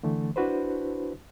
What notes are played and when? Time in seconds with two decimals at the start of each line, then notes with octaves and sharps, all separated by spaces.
0.03 D3 E3 A3
0.36 D4 E4 F#4 B4 C5